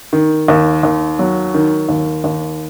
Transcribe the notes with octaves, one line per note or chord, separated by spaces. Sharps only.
D#3
D#2
D#2
F#3
D#3
D#2
D#2